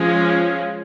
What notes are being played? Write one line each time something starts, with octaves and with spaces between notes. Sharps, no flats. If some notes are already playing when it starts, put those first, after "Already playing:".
Already playing: F3 G#3 C#4